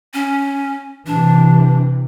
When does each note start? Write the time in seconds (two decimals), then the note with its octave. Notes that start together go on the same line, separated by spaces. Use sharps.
0.14 C#4
1.06 C3 E3 D4